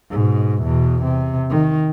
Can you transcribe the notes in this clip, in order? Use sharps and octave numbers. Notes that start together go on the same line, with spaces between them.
G#2 B2
E2 B2
C3
D#3